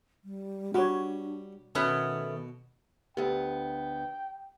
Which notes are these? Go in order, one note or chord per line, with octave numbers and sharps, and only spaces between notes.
G3
G3 D4 F#4 C#5
B2 D#3 A3 B3 C#4
D2 B3 G4 G5